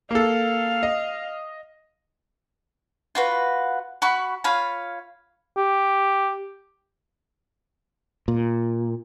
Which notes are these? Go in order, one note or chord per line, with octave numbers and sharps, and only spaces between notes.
A#3 A4 F5
D#5
F4 F#4 B4
F#4 B5 C#6
F4 C#5 F5 B5
G4
A#2